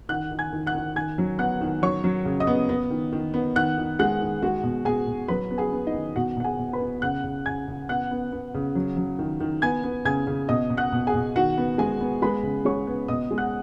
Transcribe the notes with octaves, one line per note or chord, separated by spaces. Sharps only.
D#3 F#5 F#6
D#3
G#5 G#6
D#3
F#5 F#6
D#3
D#3 G#5 G#6
F#3
B3 F#5 F#6
D#3
F#3 C#5 C#6
F#3
C#3
D#5 D#6
B3
B3
D#3
D#3
B3
D#3 F#5 F#6
D#3
G#3 F#5 F#6
D#3
G#3 F#4 F#5
B2
B2 G#4 G#5
B2
F#3 B4 B5
B3
G#4 G#5
B3
D#4 D#5
D#3
B2 F#4 F#5
B2 F#5
G#4 G#5
B2
B4 B5
B3
C#3 F#5 F#6
C#3
C#3 G#5 G#6
C#3
B3 F#5 F#6
B3
B3
C#3
F#3
F#3
D#3
D#3
B3 G#5 G#6
B3
C#3 G#5 G#6
C#3
B2 D#5 D#6
B2
F#5 F#6
B2
G#4 G#5
B2
D#3 F#4 F#5
B3
G#3 G#4 G#5
B3
G#3 B4 B5
C#3
G#3 C#5 C#6
B3
B2 D#5 D#6
G#3
F#5 F#6